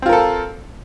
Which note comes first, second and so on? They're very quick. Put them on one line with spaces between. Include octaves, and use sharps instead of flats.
C4 F4 A#4 A4